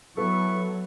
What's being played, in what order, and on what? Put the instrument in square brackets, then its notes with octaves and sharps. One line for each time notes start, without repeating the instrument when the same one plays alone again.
[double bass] F#3 [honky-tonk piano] B3 A4 [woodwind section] E4 B4 C#6